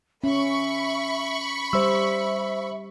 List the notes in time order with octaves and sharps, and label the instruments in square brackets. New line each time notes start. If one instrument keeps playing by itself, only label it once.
[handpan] C#4 [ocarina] E5 [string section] B5 C#6
[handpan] G3 [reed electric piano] C5 E6 [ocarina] E5